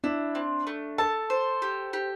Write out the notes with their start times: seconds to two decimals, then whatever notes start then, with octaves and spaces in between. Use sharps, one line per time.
0.04 D4 E4
0.35 C4
0.67 A3
0.98 A4 A5
1.30 C5
1.62 G4
1.93 G4